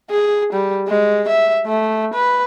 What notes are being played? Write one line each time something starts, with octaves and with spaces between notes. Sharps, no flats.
G#4
G3
G#3
E5
A3
B4